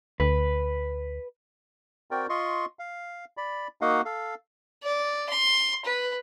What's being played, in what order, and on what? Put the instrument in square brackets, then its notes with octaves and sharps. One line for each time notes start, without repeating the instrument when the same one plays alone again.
[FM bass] D2 [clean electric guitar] B4
[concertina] C4 F#4 A#4 D5 G5
F4 D#5 C6 C#6
F5
D5 B5
A#3 D#4 F#4 D#5 F5 F#5
A4 F5
[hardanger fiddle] D5
C6
B4